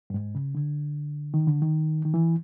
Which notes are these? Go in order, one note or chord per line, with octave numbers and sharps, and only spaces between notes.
G2
G#2
C#3
D3
D#3
D3
D#3
D#3
E3